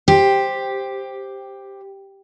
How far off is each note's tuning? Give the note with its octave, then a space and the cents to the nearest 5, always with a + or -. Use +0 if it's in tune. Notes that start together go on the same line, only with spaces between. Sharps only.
G4 +5 C5 +0